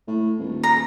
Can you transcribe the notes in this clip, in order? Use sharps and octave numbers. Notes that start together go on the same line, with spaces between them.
A2
D#1
A#5